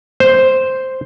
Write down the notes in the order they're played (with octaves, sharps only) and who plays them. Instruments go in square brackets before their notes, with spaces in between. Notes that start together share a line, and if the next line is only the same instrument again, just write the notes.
[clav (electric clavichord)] C5